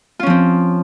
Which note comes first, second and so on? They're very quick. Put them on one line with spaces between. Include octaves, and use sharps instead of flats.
F4 C#4 F3 C4